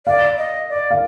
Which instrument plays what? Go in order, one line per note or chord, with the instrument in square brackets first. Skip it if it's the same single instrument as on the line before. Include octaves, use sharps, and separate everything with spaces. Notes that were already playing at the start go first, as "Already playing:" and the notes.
[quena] D5 [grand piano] F5
[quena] D#5
D5
[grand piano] F5